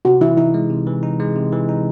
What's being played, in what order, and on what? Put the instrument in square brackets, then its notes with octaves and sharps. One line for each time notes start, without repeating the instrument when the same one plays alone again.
[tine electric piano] C3 [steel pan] F#4
[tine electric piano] E3 [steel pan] E4
[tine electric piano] D#4 [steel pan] E4
[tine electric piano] G#3
C3
E3
D#4
G#3
C3
E3
D#4